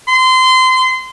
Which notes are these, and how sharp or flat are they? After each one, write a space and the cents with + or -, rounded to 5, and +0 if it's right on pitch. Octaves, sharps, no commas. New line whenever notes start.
C6 -25